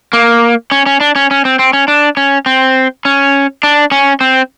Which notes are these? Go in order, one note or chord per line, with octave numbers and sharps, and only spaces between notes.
A#3
C#4
C#4
D4
C#4
C#4
C4
C4
C#4
D4
C#4
C4
C#4
D4
C#4
C4